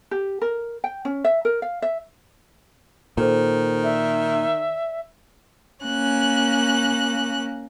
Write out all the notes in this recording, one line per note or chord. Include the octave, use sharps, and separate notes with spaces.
G4
A#4
G5
C#4
E5
A#4
F5
E5
A#2 D#3 A4 C5
D5 E5
A#3 C#4 F#6